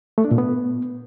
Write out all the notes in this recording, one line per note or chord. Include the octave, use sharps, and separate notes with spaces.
A3
D4
A#2
B3